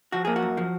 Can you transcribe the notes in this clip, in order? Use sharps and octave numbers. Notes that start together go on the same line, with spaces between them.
F3 F#4
A#3 G#4
F#4
F#2
F3